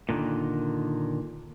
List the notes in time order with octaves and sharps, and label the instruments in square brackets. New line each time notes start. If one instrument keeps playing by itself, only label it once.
[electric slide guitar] A#2 D3 D#3